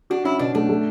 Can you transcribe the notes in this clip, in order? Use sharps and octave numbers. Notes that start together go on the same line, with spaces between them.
D4 F#4
C#4 E4
B2 D4
A3 D4
A3